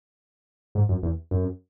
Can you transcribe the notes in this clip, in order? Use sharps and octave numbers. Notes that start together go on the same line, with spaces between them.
G#2
F#2
E2
F#2